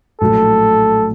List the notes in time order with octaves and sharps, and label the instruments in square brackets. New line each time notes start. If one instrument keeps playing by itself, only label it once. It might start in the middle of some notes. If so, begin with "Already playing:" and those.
[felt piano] A#1 A2 F#3 A3 [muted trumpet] A4